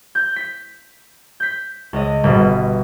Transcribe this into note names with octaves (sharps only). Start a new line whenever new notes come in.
G6
B6
G6 B6
C#2 D#5
G1 B2